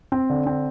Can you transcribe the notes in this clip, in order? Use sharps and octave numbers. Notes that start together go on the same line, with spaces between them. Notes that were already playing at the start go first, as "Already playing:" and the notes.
C4
D3
C4